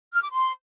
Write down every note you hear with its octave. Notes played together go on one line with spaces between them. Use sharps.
F6
D6
C6